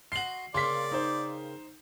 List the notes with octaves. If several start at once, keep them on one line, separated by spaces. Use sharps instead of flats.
F#4 D#5 C6 C7 F#7
C#3 A#3 C4 D5 C6 B6
D#4 C5